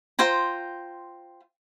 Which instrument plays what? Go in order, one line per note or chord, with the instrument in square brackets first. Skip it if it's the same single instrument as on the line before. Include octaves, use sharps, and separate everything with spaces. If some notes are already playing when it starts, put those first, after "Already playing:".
[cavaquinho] F4 C5 G5 A#5